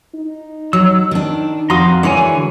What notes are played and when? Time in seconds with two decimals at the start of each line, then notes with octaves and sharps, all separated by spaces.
0.15 D#4
0.73 F#3 E6
1.11 D#3 D4
1.70 F2 F#4 F5 A#5 C6 D#6
2.03 D3 E3 G#3 F#4 A#4 C#5 G#5